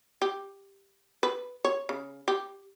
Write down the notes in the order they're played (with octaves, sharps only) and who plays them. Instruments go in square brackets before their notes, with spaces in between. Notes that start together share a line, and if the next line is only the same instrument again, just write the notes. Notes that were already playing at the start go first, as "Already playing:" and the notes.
[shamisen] G4
B4
C#5
C#3
G4